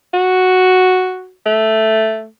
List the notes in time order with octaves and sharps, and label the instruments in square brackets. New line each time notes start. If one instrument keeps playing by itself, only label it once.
[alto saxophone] F#4
A3